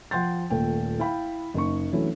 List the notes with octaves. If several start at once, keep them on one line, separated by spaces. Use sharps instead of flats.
F3 F#5 G5 C6 G6 A6
D#1 A#2 A3 G5
E4 F5 G5 B5
F#1 D#4 C#6
E3 F#3 A3 C#4 D4 E4